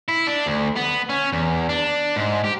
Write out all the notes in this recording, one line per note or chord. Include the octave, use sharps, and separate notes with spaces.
E4
D4
D2
B3
C#4
E2
D4
G#2
G4